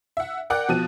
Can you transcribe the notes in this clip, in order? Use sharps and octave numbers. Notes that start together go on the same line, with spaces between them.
E5 F#5
A#4 D5 F#5 G5 D6 F#6
B2 F3 A5 D#7